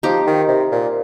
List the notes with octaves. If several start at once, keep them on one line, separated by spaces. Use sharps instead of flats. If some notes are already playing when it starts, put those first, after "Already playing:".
F3 D#4 G4
D#3
C3
A#2